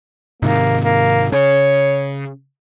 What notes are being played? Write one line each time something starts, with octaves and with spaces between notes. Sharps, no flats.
G#2 C3 D#3 A#3
A#3
C#3 C#5